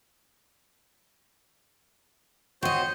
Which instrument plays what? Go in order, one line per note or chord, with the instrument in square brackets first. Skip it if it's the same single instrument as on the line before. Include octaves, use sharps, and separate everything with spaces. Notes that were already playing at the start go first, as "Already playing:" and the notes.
[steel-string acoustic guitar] D#3 D#5 [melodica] F#4 C5 C#5